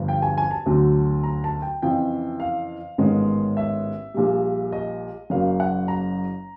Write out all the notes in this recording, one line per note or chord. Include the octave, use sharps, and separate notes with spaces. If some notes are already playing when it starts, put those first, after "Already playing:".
Already playing: G1 G2 D3 F3
G5
G#5
G#5
A5
D2 D3 F#3 A3
A#5
A5
G5
F2 C#3 E3 G5
F5
A1 G#2 D#3 G#3 B3
E5
A#1 A#2 G3
D#5
F#1 F#2 C#3 F#3 A#3 F5
F#5
A#5